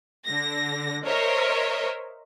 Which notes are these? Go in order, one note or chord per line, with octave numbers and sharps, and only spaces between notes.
D3 A#6
A#4 C5 C#5 D#5 E5